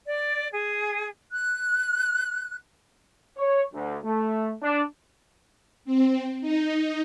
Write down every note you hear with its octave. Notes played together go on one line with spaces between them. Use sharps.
D5
G#4
F#6
C#5
D2
A3
D4
C4
D#4